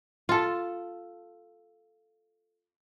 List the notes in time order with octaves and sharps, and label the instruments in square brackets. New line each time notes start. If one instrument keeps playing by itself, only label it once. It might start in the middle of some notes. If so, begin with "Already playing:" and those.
[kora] F4 A4